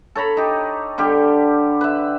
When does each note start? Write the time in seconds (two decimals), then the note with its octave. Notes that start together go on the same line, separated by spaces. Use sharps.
0.15 A4 C#5 A#5 B5
0.37 D#4 G4
0.98 D3 G3 G4
1.81 B4 E5